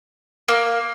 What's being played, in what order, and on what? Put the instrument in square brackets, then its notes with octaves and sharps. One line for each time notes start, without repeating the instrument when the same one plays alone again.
[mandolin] A#3